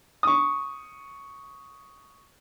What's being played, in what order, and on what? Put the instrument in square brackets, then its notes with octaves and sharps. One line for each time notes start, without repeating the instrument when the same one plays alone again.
[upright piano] C#6 D#6